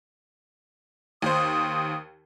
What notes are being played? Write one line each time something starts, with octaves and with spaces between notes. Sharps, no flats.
D#2 C5 D#6